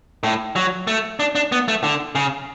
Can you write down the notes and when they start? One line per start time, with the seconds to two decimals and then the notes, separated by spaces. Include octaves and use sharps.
0.23 A2
0.56 F#3
0.87 A3
1.20 D4
1.35 D4
1.52 B3
1.68 A3
1.84 D3
2.15 C#3